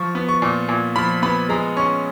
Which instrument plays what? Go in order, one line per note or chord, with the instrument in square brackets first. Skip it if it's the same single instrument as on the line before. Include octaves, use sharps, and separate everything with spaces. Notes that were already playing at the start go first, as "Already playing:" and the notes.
Already playing: [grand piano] F3 C#6
B3
C#6
A#2
A#2
F3 B5
B3 B5
G#3 A#5
C#4 C#6